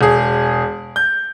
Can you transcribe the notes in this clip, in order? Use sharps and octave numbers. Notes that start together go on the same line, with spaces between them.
E1 G#4
G6